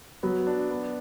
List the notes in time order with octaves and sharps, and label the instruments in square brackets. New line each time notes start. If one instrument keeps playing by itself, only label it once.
[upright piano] F#3 [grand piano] B3
[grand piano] D4
B3